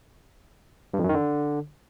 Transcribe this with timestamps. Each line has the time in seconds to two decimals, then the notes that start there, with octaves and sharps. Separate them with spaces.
0.94 G2
0.99 F2
1.04 F#2
1.09 D#3
1.14 D3